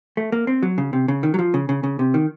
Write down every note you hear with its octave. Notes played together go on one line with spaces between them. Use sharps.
A3
A#3
C4
F#3
C#3
C3
C#3
D#3
F#3
F3
C#3
C#3
C#3
C3
D#3